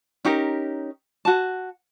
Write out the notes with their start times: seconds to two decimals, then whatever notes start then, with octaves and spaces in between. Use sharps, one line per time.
0.25 C#4 D#4 G4 A#4
1.25 F#4 A5